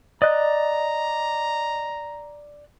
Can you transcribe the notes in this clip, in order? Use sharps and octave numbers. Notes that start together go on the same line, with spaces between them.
D5 D#5 A#5 F#6